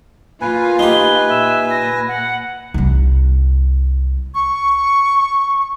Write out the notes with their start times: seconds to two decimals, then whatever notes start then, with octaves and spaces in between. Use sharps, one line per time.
0.41 A#3 F4 B4 G#5
0.79 D#4 G4 G7
1.28 A#2 E5
1.70 A#6
2.08 F#5
2.74 C2 G3
4.35 C#6